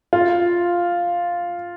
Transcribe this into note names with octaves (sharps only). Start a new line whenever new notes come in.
F4